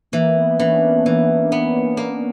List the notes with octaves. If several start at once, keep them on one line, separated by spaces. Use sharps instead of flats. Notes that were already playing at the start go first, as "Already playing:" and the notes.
E3 A#3
B3
E3 C#4
D4
C#4
E3 B3
A#3
B3
A#3
A#3